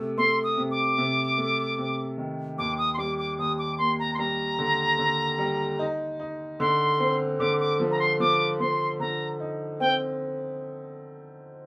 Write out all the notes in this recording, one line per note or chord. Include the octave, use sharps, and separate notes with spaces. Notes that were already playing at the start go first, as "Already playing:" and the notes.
Already playing: C3 A3
A3 C6
D#6
C3
D6
C3
A3
C3
D#3
D#2 D6
D#6
C6
G3 D6
D6
D#2 D#6
D6
A#3 C6
A#5
C6
G3 A#5
D3
D3
G3
D#4
D#4
D3 C6
C4
D3 D6
D6
F3
A#5
C6
F3 D6
F3 C6
D3 A#5
D#4
C4 G5